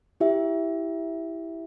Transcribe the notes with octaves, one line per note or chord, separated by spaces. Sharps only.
E4 G4 E5